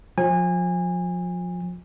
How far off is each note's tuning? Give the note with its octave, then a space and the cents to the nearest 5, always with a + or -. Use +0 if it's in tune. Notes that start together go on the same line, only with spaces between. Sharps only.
F3 +35 G#5 -25